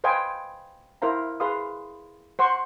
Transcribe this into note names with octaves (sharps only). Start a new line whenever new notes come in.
B4 C5 D#5 F5 G5 G#5
E4 A#4 C5 F5 A#5
G#4 B4 F5 C6 D#6
C5 F#5 C6 C#6